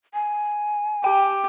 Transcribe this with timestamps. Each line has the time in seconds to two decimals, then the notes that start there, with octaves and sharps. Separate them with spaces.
0.14 G#5
1.04 G4 G5